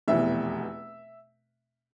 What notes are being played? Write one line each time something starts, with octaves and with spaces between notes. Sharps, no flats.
F1 E2 B2 E5